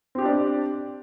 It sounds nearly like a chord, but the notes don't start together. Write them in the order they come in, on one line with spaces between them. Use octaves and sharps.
C4 G4 D4 D5